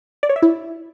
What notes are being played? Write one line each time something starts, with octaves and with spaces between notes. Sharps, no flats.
D5
C#5
E5
E4